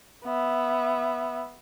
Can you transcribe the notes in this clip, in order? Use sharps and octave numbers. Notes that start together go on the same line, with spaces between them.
B3 E5